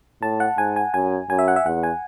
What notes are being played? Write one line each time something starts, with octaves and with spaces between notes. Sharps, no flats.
A2 A5
F#5
G#2 G#5
G#5
F#2 G#5
F#2 G#5
E5
F#5
E5
E2 F#5
G#5